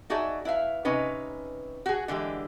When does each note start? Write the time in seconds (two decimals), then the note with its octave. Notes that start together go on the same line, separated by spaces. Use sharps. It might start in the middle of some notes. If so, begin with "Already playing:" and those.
0.10 D#4 F#4 G#4 D5 E5
0.45 E4 B4 E5 F5
0.85 C3 C#4 D#4 B4
1.86 F#4 G#4
2.08 D3 E3 G#3 G4